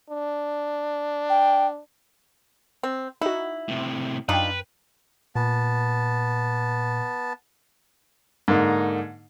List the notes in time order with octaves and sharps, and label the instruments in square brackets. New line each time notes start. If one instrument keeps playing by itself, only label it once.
[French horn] D4
[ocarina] G5
[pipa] C4
[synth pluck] D#4 F#4 [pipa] E4
[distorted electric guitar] A2 C3
[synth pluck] F#2 G5 [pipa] D4 D#4 F4 [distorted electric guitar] B4
[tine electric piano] A#2 [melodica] B3 A5
[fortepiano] G#2 D3 A#3 D#4